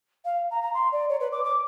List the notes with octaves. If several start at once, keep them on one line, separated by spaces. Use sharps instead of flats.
F5
A#5
A#5
C6
D5
C#5
B4
D6
D6